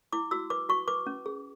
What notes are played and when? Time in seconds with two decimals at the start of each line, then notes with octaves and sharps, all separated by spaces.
0.13 E4 D6
0.31 F#4 E6
0.50 B4 D6
0.69 F#4 C#6
0.88 B4 D6
1.07 C#4
1.26 G#4